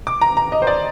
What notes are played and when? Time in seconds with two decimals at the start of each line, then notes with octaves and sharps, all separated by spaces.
0.07 D6
0.21 A#5
0.37 A#5
0.52 D#5
0.62 C5
0.67 D5